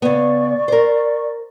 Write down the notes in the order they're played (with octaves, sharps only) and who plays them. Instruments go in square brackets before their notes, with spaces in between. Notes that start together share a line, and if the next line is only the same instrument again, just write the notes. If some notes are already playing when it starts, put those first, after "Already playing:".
[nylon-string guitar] C#3 B3 [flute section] D5 C#6
[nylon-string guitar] A#4 C5